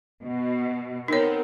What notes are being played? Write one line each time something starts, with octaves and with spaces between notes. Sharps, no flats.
B2
B3 C4 D#4 A#4 C#5